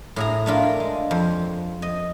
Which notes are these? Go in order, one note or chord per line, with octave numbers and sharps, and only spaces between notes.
A2 G#4 A#5
A3 D4 F4 A#4
G#3
F2
D#5